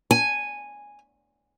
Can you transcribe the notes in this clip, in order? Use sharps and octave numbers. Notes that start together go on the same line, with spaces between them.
G#5